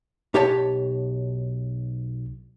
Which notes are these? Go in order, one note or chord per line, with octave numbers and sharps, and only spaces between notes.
B1 G4 C#5 A5